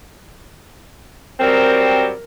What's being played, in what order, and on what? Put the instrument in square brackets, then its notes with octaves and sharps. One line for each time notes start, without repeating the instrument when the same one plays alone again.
[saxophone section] F#3 G3 C4 [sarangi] A#4